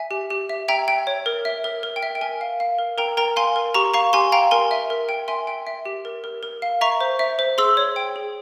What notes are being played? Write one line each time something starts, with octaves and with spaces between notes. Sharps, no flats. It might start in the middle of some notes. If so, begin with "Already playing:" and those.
Already playing: E5 G#5
G4
G4
E5
E5 G5 A#5
G5
C#5
A#4
E5
A#4
A#4
G5
E5
G5
A#4 G#5
F5
F5
A#4
A#4 G5 A#5
A#4 G5 A#5
F5 G#5 C6
A#4
G4 A#5 C#6
F5 A#5 C#6
G4 G#5 C6
F5 G5 A#5
A#4 G#5 C6
E5
A#4
G5
E5 G#5 C6
G5
E5
G4
A#4
A#4
A#4
F5
E5 A#5 C#6
C5
E5
C5
G#4 C6 E6
C#5
G5
G#4